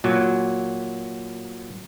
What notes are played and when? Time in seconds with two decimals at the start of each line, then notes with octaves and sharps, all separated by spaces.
0.04 A#2 F#3